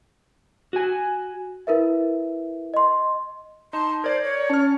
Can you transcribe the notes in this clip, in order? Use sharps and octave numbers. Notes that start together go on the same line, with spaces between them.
F#4 G#5
E4 A#4 B4 E5
D#5 C6
D#4 A5 C6
A#4 C5 D5 G#6
C#5
C#4 A5 F6